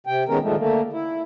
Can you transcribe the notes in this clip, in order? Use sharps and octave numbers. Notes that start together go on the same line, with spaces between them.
C3 G5
D#3 G#3 B3 C#4 A#4
A#2 D#3 F3 G#3 A3
D3 A3 A#3
E4